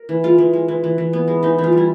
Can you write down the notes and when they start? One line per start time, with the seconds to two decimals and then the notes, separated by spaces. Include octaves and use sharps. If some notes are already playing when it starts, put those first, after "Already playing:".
Already playing: A#4
0.09 E3
0.23 G#3 F4
0.38 E3
0.53 G#3
0.68 E3
0.84 E3
0.98 E3
1.13 B3
1.28 G#3
1.43 E3 D#4
1.58 E3
1.64 F4
1.73 G3 E4